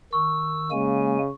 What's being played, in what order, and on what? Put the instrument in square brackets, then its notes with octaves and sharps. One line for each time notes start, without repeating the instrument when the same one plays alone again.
[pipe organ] D#3 E6 [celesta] C#6
[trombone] C#3 [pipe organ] G#3 A#3 G#5